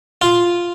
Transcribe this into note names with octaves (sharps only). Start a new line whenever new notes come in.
F4